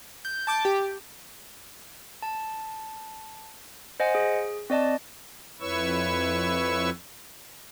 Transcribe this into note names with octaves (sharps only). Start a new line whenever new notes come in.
G6
A5 D6 G6
G4
A5
C5 D#5 F#5 G#5
G#4
C4 D5 D#5 A5
F2 E4 B4 C#5 C#6 E6